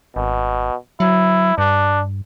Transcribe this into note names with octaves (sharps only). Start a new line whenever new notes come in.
G#1 B2
F#3 E4
G2 D4